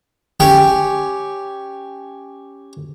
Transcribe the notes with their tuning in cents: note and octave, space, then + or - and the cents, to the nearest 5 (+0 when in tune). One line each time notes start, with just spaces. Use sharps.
C#4 +0 G4 +0 G5 +0